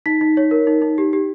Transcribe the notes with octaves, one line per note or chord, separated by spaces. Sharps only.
D#4 B6
D#4
C#5
A#4
D#4
D#4
G4
G4